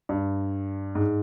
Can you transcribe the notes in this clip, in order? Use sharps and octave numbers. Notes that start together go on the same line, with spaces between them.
G2
G#2